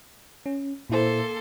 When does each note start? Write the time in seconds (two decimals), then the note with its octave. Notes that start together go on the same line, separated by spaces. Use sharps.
0.46 C#4
0.90 A#2 A#3 E4 A4 C5 C6